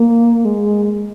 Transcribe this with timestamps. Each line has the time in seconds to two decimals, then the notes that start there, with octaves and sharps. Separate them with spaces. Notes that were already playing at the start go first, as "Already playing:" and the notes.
Already playing: A#3
0.45 G#3